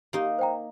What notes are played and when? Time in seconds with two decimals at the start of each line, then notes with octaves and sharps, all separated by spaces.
0.13 A#3 D#4 G4
0.39 C5 G5 A#5